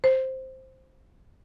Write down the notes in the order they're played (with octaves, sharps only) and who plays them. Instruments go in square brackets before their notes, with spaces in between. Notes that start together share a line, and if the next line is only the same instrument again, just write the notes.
[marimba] C5